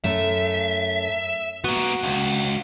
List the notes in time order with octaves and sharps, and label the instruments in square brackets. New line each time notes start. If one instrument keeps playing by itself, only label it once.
[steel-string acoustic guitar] F#2 A3 [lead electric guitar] E5
[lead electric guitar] A#3 B3 [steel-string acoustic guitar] F#4
[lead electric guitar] C#2